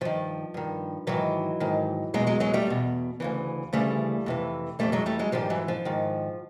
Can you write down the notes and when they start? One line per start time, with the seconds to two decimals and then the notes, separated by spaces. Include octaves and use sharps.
0.01 G2 D#3 F3
0.54 G2 D#3
1.07 G#2 D#3 E3 F#3
1.60 G#2 D#3
2.14 E2 B2 F#3 G#3
2.27 F#3 G#3
2.40 F#3 G#3
2.54 G3 A3
2.67 E2 B2
3.20 D2 C#3 E3
3.73 D2 C#3 E3 G3 A3
4.26 F2 C3 E3
4.79 F2 C3 E3 G3 A3
4.92 F#3 G#3
5.06 G3 A3
5.19 F#3 G#3
5.32 G#2 D#3 F3 G3
5.50 E3 F#3
5.68 F3
5.85 G#2 D#3